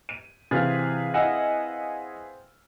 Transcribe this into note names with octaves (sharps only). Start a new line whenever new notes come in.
D#7
C3 E3 C4 G#4 B4 F5 F6 A6
E4 D#5 F#5 G#5 E6